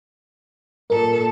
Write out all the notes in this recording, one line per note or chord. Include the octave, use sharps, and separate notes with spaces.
A#2 A4 A#4